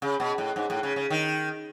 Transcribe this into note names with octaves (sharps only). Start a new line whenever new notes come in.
C#3
B2
A2
G#2
A2
C#3
C#3
D#3